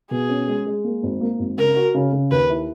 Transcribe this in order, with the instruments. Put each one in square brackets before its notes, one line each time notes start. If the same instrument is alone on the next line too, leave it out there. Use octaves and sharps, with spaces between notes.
[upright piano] B2 [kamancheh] G#4
[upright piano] C#4
G#3
G#3
A#3
G#1
A#3
G#1
[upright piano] C#3 [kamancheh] A#4
[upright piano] F#4
C#3
C#3
[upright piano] D#2 [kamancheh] B4
[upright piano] E4